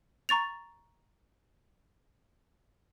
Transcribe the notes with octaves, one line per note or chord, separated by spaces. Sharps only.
A#5 C#6 A6 F7